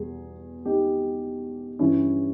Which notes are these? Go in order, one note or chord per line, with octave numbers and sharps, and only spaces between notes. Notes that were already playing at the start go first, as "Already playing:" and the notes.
Already playing: E2 B2 G3 G#4
D#4 G4
G2 E3 G3 C#4 E4